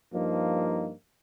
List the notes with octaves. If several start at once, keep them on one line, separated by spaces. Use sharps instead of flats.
G2 F3 A#3 D#4